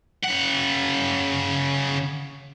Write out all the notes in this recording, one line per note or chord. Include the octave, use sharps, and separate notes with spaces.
C#3 F#5